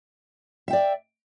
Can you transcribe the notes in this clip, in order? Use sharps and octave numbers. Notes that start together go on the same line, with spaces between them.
D5 E5 G5